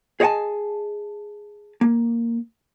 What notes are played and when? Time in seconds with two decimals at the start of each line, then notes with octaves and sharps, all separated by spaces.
0.20 G#4 C#5 D#5 F#5 G#5 A5
1.81 A#3